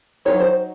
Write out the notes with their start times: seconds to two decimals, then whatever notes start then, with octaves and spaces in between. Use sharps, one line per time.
0.25 F#3 A#3 D#4 C#5
0.40 C5